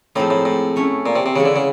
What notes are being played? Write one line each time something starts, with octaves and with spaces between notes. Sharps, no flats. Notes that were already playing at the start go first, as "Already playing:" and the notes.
A2 F3 G#3 C4 D#4
A2
A2
A3 C#4 E4
A#2
C3
C3
C#3 E3 G#3 B3
D3
C#3